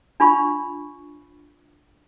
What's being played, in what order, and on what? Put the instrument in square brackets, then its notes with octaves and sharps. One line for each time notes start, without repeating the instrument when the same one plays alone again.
[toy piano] D4 F4 B5 C#6